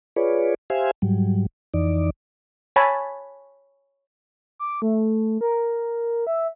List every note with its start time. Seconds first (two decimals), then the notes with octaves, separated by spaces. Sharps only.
0.16 F4 G#4 B4 C#5 D5
0.70 G4 C5 E5 F5 G#5
1.02 G#2 F#3 G3
1.74 F2 E3 D#4 D5
2.76 C#5 G#5 A5 B5
4.59 D6
4.82 A3
5.41 A#4
6.27 E5